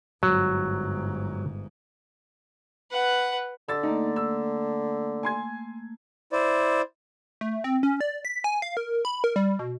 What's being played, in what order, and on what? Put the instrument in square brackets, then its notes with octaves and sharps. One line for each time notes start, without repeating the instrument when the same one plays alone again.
[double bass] G1 G#2 [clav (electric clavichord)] F#3
[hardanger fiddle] B4 F#5
[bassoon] D3 [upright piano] E6 A6
[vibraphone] A3 A#3 [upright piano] D#4
[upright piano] E6
G#5 C6 G#6
[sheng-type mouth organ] E4 C5 D5
[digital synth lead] A3
C4
C#4
D5
B6
G#5
F5
A#4
B5
A#4
G3
B2